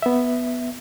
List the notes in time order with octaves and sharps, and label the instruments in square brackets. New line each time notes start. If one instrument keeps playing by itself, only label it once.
[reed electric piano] B3 E5